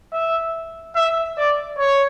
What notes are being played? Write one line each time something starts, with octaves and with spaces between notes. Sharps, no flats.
E5
E5
D5
C#5